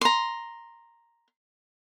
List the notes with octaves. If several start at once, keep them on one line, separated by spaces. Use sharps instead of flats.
A#5 C6